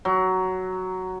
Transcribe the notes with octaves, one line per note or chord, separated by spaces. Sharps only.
F#3